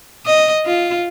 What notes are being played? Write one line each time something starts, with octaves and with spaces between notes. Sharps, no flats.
D#5
F4